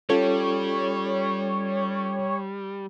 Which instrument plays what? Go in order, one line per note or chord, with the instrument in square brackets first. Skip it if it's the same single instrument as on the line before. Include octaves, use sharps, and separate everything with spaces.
[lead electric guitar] G3 [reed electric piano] C#4 F4 A4 [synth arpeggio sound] C#5